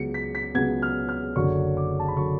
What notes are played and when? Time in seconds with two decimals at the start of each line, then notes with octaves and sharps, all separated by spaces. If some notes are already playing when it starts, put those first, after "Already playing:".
Already playing: C#2 C#3 F#3 B3 C#7
0.14 B6
0.35 B6
0.54 C#2 C#3 F#3 B3 G#6
0.82 F6
1.09 F6
1.36 F#1 F#2 D3 F#3 C#6
1.77 D6
1.99 A5
2.08 B5
2.16 D3 F#3 C#6